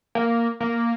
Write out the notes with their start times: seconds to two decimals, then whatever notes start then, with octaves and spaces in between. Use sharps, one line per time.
0.15 A#3
0.60 A#3